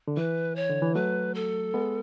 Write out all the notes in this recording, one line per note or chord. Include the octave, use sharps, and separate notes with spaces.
D3
E3 B4
C#5
D3
E3
F#3 A3 B4
A4
G#3 B3